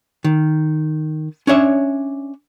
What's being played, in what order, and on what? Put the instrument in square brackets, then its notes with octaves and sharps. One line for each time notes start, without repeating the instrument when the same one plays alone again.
[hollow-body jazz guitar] D#3
C#4 D4 C#5 E5